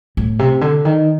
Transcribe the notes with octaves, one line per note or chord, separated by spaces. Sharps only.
A2
C3
D3
D#3